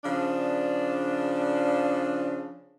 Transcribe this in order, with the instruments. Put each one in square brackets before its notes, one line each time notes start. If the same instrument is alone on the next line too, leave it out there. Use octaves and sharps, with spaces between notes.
[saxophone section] C#3 F3 D4